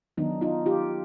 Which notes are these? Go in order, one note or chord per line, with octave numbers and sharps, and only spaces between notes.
D#3 F#3 B3 D4 D#4
D#4 F4
F4 G4